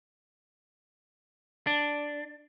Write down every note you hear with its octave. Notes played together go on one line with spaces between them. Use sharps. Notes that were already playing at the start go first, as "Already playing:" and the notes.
D4